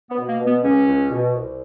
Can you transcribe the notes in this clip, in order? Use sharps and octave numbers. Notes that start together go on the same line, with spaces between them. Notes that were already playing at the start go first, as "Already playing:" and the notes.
B3
B2
A#3
B2
B3
C#2 C#4
C#2
B2
C2